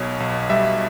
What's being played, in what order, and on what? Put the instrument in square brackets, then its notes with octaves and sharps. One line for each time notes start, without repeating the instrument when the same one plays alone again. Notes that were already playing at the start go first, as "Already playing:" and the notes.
Already playing: [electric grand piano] B1 B2 C#5
B1
G3 E5